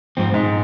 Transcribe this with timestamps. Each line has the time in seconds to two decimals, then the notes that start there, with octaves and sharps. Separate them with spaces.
0.17 G#2 F3 C4
0.34 G#2